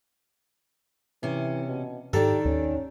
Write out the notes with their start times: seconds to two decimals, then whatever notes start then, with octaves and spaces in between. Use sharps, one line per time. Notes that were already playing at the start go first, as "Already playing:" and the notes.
1.23 C3 E3 C#4
1.69 B2
2.13 G#2 D#3 D4 G4 A4
2.45 D#2 C#4